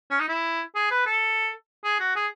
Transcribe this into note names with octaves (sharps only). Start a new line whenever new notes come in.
C#4
D#4
E4
G#4
B4
A4
G#4
F#4
G#4